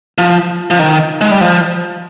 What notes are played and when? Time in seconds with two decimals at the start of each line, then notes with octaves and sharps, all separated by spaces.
0.18 F3
0.71 F3
0.79 D#3
1.21 G#3
1.31 G3
1.41 F3